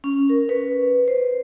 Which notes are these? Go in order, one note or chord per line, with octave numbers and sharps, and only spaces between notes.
C#4
A#4
B4
C5